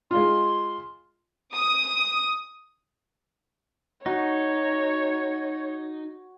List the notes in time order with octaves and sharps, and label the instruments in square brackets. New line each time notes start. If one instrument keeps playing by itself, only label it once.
[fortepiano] G#3 F4 [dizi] C6
[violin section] D#6
[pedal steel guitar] D#4 [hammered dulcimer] F#4 [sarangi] C#5